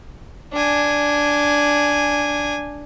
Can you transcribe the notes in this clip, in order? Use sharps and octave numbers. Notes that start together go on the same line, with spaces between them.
D4 G#5